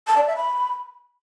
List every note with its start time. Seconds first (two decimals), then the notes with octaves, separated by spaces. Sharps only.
0.07 A5
0.17 D5
0.27 E5
0.37 B5